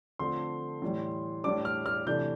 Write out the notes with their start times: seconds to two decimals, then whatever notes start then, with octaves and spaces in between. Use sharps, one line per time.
0.19 D3 F3 A3 C4 C6
0.82 A2 E3 G3
1.44 A2 G3 D4 D6
1.65 F6
1.86 F6
2.06 C3 E3 A3 D4 G6